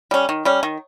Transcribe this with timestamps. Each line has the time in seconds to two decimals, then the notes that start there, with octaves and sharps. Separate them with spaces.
0.11 G3 C#4
0.29 D#3
0.45 G3 C#4
0.63 D#3